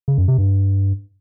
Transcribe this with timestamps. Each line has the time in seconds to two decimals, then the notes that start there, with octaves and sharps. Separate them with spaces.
0.08 C#3
0.18 F#2
0.28 C3
0.38 G2